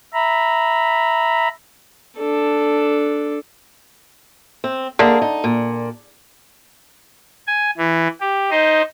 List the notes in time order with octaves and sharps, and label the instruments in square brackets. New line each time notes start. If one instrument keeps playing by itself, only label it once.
[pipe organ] E5 A#5 B5
[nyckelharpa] D4 A4
[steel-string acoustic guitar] C4
[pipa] D3 [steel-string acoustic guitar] A#3 G#4
[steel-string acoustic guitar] D#4
A#2
[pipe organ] G#5
E3
G4
D#4 C5 D#5